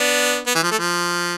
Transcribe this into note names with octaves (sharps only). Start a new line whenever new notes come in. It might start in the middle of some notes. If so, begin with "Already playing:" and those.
Already playing: B3 D4
B3
E3
F3
A3
F3